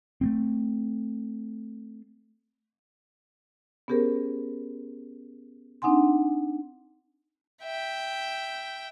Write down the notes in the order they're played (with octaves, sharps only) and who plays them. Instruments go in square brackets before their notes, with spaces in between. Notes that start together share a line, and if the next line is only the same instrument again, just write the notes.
[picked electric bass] A3 A#3 C4
[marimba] B3 C#4 G4 G#4 A#4 C5
C4 D4 D#4 F#5 G#5 C6
[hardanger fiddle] E5 G5